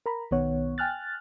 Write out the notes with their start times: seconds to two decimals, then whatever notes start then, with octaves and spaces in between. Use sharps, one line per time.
0.06 A#4 A#5 B5
0.31 B1 D#3 B3 C#5 F#5
0.78 G5 G#5 F6 F#6 A6